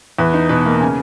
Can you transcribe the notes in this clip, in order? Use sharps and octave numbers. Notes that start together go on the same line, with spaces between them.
E2 B4
D#4
B2 B4
A#3
C#3 G#5